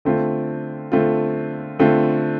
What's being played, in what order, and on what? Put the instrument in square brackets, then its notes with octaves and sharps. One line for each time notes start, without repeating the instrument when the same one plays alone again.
[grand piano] D3 A3 C4 F4
D3 A3 C4 F4
D3 A3 C4 F4